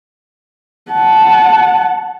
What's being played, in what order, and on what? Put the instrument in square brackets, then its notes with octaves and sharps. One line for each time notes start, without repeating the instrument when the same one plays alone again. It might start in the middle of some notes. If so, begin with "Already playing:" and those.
[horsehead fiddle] F#5 A5